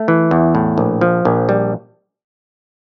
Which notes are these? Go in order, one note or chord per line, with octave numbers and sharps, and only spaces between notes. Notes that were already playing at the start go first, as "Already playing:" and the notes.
Already playing: A3
E3
E2
A2
A#1
F3
A#1
G3